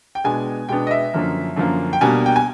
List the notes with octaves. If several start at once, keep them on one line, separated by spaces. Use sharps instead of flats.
G5
B2 G#3 B3 D4 G#5
B2 G#3 B3 D4 G5
D#5
E5
F#2 D3 F3 A#3
F#2 D3 F3 A#3
G5
B2 G3 A#3 D4 G#5
G5
G#5